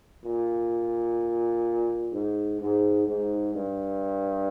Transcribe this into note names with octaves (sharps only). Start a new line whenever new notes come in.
A#2
G#2
G#2
G#2
G2